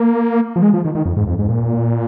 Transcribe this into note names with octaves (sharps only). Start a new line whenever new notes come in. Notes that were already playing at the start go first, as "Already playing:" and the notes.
Already playing: A#3
F3
G#3
F3
D#3
D#3
F2
G#2
F2
G#2
A#2